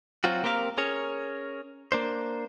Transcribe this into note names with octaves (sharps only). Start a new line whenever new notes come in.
F#3 C4 F4 F#4
A#3 C4 G4 A#4 F5
C#4 G#4 A#4 C#5
A#3 D4 C5